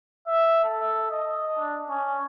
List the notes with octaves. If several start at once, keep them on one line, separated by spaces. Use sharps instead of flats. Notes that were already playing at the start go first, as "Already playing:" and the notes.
E5
A4
D#5
D4
C#4